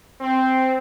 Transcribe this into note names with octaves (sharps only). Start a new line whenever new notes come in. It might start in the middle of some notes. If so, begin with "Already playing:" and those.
C4